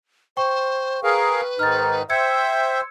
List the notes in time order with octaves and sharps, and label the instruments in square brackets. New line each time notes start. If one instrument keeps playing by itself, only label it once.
[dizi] C5 [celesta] G5 C#6
[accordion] G#4 A#4 F5 [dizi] B4
[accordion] G#2 D#3 D#4 [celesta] F6 A6
[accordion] C5 E5 [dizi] G5 [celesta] E6 G#6 C#7